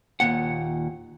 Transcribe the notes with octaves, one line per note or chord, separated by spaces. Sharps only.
D#2 A#2 F#5